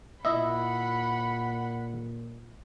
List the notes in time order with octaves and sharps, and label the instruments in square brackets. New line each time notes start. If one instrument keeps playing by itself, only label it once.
[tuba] A#2 [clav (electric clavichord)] E4 D#5 E5 [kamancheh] F#5 B5